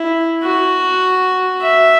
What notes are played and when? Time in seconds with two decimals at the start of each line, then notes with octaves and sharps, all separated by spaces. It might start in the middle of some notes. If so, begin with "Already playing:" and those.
Already playing: E4
0.43 F#4
1.63 E5